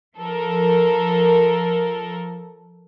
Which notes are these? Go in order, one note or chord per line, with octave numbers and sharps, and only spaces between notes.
F3 A4 A#4